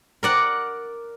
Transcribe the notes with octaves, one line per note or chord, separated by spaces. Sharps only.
A#4 D5 F#5